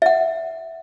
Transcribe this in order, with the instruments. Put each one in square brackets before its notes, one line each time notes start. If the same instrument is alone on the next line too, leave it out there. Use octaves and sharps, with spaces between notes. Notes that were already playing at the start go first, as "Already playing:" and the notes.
[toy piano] E5 F#5